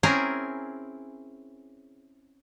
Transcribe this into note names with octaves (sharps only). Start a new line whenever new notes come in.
C4 C#4 E4 G#4 A#4 A#5